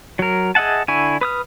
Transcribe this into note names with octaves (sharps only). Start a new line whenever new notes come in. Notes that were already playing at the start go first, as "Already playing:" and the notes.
F#3 A#4
G#4 D#5 E5 F#5 A5
D3 E4 G#5 C#6
B4 D#6 F6